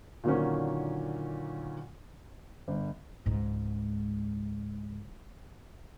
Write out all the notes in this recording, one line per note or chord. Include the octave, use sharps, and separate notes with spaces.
A#2 D3 D#3 F#3 A#3 C#4
G1
C#2 G#2